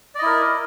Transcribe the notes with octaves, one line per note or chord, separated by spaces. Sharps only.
E4 A#4 D5 D#5